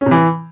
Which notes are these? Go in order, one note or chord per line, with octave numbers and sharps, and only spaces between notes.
C#4
C3
E3